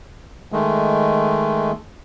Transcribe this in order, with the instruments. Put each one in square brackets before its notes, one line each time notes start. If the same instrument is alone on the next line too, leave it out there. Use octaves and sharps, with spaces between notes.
[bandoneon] D#3 G#3 A3